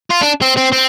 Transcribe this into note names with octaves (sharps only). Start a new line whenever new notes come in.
F4
D4
C4
C4
C4